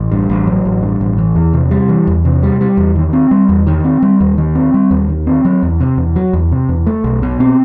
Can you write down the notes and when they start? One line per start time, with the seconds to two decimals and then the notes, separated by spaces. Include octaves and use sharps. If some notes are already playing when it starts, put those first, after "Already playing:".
Already playing: A1
0.11 G2
0.29 A1
0.47 F#3
0.65 A1
0.82 G2
1.01 A1
1.18 E3
1.35 E2
1.53 C3
1.71 G3
1.89 E3
2.07 E2
2.25 C3
2.43 G3
2.61 G3
2.77 E2
2.96 D#3
3.13 C4
3.31 G3
3.49 E2
3.67 D#3
3.84 C4
4.02 G3
4.20 D#2
4.38 D#3
4.55 C4
4.74 G3
4.91 D#2
5.09 D#3
5.27 C4
5.45 F#3
5.63 E2
5.80 C3
5.97 E2
6.16 F#3
6.33 E2
6.52 C3
6.69 E2
6.86 A3
7.04 B1
7.22 B2
7.40 C4